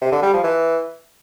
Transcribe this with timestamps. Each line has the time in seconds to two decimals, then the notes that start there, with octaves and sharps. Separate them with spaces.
0.01 C3
0.12 D3
0.22 G3
0.33 F3
0.44 E3